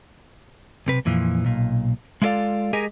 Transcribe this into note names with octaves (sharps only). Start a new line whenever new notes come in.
B1 C3 B4
F2 A#2 E3 F3
B1 A#2
G#3 E4 F4 A4 D5 F5
G#3 G4 G#4 A#4 D#5 G#5